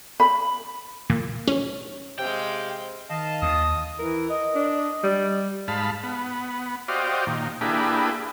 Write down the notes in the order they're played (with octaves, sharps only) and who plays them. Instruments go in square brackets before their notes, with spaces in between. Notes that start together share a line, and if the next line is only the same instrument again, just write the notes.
[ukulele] B5
[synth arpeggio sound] A#2
C#4
[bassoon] C3 [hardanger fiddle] G#3 F5 [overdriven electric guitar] G5
[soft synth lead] D#3 [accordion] D#5 F5 A5
[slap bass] D#2 [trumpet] D#6
[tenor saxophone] E3 [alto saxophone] A#4
[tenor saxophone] D#5
[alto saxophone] D4
G3
[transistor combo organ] G#2 F5 A5 B5
B3
F#4 G4 C5 D5 D#5 F5
A#2 D#3
A#3 D4 E4 G4 G#4 B4